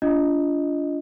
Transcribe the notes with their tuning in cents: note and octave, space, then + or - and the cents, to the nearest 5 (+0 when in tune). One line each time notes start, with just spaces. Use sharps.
D4 -30 F4 -30 D#5 +0